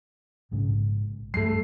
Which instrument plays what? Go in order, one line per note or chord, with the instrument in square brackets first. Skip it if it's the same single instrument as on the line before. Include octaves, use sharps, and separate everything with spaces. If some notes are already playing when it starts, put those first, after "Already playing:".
[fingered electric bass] A#1 G#2 C#3
[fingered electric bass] G2 G3 [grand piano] A3 C7